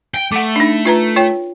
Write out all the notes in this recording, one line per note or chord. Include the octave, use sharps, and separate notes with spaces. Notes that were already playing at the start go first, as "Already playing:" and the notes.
G5
A3 F#5 D6
D4 D#4
F4 B4 A#5
F4 C#5 G5